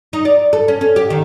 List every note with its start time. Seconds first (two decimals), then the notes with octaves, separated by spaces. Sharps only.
0.13 D#4
0.25 D5
0.53 A4
0.68 C#4
0.81 C#4
0.96 G4
1.10 D#3